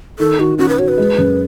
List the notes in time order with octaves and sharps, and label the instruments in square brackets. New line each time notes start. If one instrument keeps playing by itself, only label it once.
[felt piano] D#3 [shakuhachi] A4
[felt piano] D#3 [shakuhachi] F#4
[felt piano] C#4 [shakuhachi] F#4
[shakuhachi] B4
[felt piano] F#4 [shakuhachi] C#5
[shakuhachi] B4
[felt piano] G#3
F#2